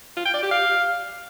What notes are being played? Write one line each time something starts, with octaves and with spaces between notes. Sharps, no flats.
F4
G5
D5
G4
F5